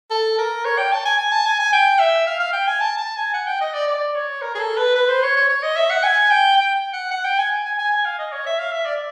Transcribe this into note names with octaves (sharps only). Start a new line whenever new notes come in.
A4
A#4
C#5
G5
A5
G#5
G#5
A5
G#5
G#5
G5
E5
F5
F5
G5
G#5
A5
A5
G#5
F#5
G5
D#5
D5
D5
C#5
A#4
G#4
A4
B4
B4
C5
C#5
C#5
C#5
D#5
E5
F#5
G#5
G5
G5
F#5
F#5
G5
G#5
G#5
G#5
G#5
F5
D#5
C#5
E5
F5
E5
D5